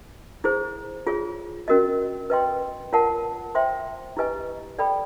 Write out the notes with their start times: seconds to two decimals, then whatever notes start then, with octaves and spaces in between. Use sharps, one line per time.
0.44 E4 G#4 C5
1.07 F4 G#4 C#5
1.68 C#4 F#4 A#4 D#5
2.30 B4 D#5 G5 C6
2.93 F4 A#4 C#5 F#5 A5
3.55 C5 E5 G5 C6
4.17 E4 G4 B4 D#5 G#5
4.79 A4 D5 G5 B5